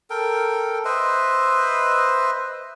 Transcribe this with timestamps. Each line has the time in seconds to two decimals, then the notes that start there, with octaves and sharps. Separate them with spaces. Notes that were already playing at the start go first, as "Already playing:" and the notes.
0.10 A4 A#4 G5
0.85 B4 C5 D#5 E5